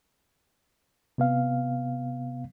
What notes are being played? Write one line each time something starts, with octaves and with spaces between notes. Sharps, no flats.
C3 B3 F5